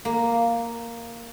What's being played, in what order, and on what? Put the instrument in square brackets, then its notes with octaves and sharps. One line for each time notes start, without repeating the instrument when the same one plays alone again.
[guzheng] A#3